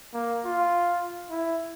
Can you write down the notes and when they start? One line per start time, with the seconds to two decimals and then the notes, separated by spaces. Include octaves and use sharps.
0.14 A#3
0.45 F4
1.30 E4